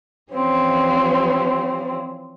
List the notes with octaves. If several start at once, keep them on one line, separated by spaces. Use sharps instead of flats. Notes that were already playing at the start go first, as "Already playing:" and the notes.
E3 F3 G3 C4 C#4